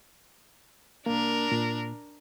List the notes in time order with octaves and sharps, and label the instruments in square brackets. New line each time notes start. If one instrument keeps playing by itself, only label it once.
[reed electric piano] C2 A#3 [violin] D4 A#4
[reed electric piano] A#2